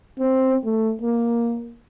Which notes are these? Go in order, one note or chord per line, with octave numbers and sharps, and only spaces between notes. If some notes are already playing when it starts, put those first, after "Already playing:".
C4
A3
A#3